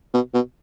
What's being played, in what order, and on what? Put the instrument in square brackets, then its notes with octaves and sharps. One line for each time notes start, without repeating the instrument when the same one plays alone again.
[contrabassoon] B2
B2